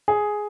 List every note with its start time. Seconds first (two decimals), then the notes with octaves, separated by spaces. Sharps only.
0.08 G#4